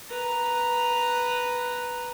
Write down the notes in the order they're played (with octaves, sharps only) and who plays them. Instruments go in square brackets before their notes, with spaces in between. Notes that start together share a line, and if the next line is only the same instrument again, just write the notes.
[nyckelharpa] B4 A#5